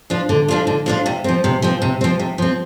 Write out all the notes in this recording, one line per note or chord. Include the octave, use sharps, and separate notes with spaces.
F3 D4 F4
D3
F3 D4 F4
D3
F3 D4 F4
C3
F3 C4
C3
F3 C4
C3
F3 C4
C3
F3 C4